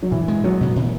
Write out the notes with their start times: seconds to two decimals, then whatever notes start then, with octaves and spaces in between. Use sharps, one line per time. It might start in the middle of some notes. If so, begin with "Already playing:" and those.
0.02 F#3
0.11 A#2 E3
0.28 G#3
0.44 F#3 B3
0.61 A#2
0.76 A#2 E3